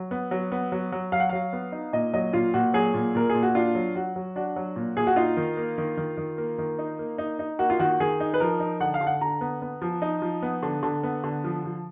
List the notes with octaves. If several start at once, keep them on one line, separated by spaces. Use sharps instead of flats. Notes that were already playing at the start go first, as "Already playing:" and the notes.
Already playing: F#3
B3
F#3
B3
F#3
F#3
F#3 F5
F#5
F#3 F5
B3
D#4
A#2 D#5
F#3 D#5
A#2 F4
A#2 F#4
F#3 G#4
A#2
A#2 A#4
G#4
A#2
F#4
D4 F4
F#3
F#3 F#4
F#3
D4 F#4
F#3
A#2
A#2 G#4
F#4
D#4 F4
D#3
A#3
D#3
D#3
D#3
A#3
D#3
D#4
A#3
D#4
D#4
A#3 F#4
F4
D#3 F#4
D#3 G#4
D#4
B4
F3 A#4
D#4
D3 F#5
F5
D3
F#5
D3 A#5
B3
B3
F3
D#4
F3
B3
D3
D3
B3
D3
F3
F3